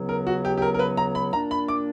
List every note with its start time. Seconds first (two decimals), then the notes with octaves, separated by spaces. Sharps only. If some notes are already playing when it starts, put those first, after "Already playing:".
Already playing: C#2 C#3 F#3 B3
0.09 A#4
0.27 F#4
0.45 G4
0.57 G4
0.62 A#4
0.74 A#4
0.79 B4
0.97 A#5
1.15 B5
1.33 A#2 A#3 D4 A#5
1.51 B5
1.68 D6